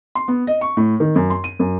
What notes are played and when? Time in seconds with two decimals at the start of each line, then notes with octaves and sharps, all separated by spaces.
0.15 C6
0.28 B3
0.47 D#5
0.61 C#6
0.77 A2
1.00 D#3
1.15 F#2
1.30 C6
1.44 D#7
1.59 F#2